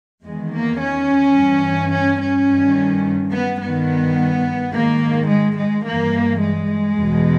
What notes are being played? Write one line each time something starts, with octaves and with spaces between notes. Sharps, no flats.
E2 D#3 G#3
A#3
C#4
G2 E3
C#4
C#4
G2 D#3
B3
G2 D#3 B3
G#2 D#3 A#3
G#3
G#3
G2 E3 A#3
G#3
E2 B2